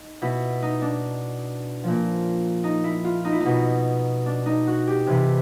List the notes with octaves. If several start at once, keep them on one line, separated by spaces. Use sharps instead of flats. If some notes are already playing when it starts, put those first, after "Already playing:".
Already playing: D#4
B2 E4
D#4
D4
A#2 F3
D#4
E4
F4
D#4
E4
B2 D#4
D4
D#4
F#4
G4
C3 E3